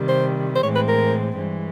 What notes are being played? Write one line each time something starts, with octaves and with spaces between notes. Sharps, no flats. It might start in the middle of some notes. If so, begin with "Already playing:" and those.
Already playing: C3 D#3 G3
C5
C5
A2 E3 G#3 C4 C#5
B4
A#4
G2 E3 G#3